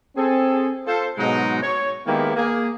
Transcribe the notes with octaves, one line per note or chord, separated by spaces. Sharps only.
C4 G#4 A4
F4 A4 C5
G#2 B2 F#3 G#3 D#4
C#5
D#3 G#3 A#3 B3 E4 G4
A#3 G#4